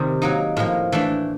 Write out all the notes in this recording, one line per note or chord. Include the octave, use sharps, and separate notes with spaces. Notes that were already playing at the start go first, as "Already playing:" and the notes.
Already playing: C3 D#3 G3
F#3 A#3 D#4
A2 F3 A#3
E3 A3 D4